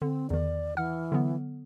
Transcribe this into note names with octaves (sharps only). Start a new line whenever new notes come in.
D3 C4
E2 D#3 D5
E3 F#5 F6
D3 F#3 B3